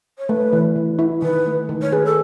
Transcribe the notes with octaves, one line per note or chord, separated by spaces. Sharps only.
C#5
A3 B4
E3
E3
E4
D#3 B4
A3
D#3
C#5
G#4 B4
A4